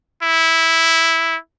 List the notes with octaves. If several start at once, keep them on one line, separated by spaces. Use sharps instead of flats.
E4